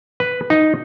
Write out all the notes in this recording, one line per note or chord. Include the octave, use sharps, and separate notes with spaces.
B4
D#4